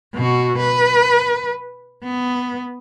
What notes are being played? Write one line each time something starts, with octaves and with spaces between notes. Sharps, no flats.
B2 F#4
B4
B3